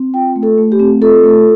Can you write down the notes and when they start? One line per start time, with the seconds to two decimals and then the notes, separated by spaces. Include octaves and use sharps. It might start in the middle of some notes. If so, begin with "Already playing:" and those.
Already playing: C4
0.14 F4 G5
0.36 A3
0.43 A4
0.58 A3
0.72 G4
0.79 C4
1.01 F4 A4
1.23 A3